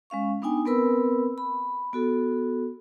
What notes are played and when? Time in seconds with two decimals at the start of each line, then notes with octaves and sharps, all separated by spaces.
0.10 G#3 C#4 F5 C#6
0.42 B3 D4 D#4 G5 G#5 D#6
0.65 B3 C4 A#4 B4 B5 E6
1.38 B5
1.93 B3 F#4 A4